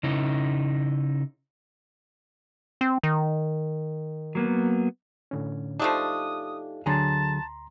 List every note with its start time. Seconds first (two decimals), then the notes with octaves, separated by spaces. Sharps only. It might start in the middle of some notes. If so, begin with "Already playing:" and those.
0.03 C#3 C#4 D#4 E4
2.81 C4
3.03 D#3
4.35 F#3 A#3 B3
5.31 A2 D3 C#4
5.80 F3 A3 D4 D#4 G4 A4 D#6
6.86 D2 D3 F#3 G#4 A5 A#5 C6